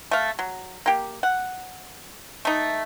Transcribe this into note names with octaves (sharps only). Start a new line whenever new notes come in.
A3 F5
F#3
A#3 G4
F#5
A3 D#4